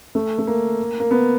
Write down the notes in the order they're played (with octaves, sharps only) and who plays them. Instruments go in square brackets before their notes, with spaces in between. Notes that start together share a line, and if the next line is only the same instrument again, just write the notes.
[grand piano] A3
A3
A#3
A#3
B3